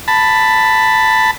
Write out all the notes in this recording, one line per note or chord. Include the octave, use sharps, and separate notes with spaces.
A5 B5